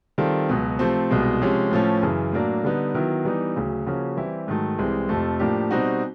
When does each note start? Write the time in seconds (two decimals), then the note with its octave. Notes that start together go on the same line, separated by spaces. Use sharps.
0.18 D#3 G3 C4 F4 A4
0.49 C#2 B2 F#3
0.79 C3 F3 A3 C4
1.10 C2 B2 G#3
1.41 C3 F3 G#3 C#4
1.71 A2 F3 A3 C#4
2.02 F#2 C#3 E3
2.33 A2 F#3 A#3 D4
2.64 D3 G3 B3 D#4
2.94 D#3 F#3 B3 E4
3.25 E3 G3 B3 D#4
3.56 D2 C#3 F#3
3.86 C#3 F3 A#3 C#4 F#4
4.17 E3 G3 C4 E4 G4
4.48 G#2 D#3 F#3 A3
4.79 C2 C3 E3 G#3 C4
5.09 F2 C3 F3 A3
5.40 A2 F3 A#3 D4 G4
5.71 B2 G3 C4 D#4 F#4